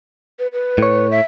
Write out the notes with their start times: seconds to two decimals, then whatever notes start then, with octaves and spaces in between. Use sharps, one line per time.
0.39 B4
0.53 B4
0.78 A2 C#5
1.11 E5